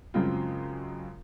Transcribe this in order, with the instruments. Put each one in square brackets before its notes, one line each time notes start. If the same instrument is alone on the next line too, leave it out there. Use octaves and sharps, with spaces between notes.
[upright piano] F#2 C#3 G#3 C4 F4